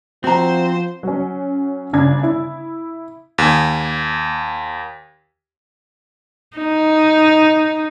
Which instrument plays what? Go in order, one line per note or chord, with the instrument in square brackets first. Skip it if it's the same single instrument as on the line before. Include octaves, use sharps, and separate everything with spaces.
[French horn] F3 [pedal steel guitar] C4 [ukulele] F#4 A#5 [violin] C5
[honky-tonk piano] F#3 C#4
G1 C#3 D4 G#6
E4
[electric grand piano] D#2 G#5
[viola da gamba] D#4